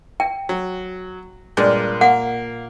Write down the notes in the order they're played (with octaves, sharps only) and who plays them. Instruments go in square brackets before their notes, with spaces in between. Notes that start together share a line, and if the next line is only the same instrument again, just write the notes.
[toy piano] G5
[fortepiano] F#3
[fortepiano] G2 G#3 [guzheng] A#2
[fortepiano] A#3 [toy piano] F#5